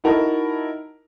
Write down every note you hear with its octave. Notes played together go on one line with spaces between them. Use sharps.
D#4 E4 F#4 A#4 A5